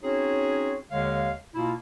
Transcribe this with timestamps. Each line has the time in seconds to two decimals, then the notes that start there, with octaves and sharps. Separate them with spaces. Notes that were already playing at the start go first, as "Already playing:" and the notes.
0.03 C4 C#4 D#4 F#4 G#4 C#5
0.91 D#2 D3 G#3 C#5 F5
1.55 B2 A#3 E4 F4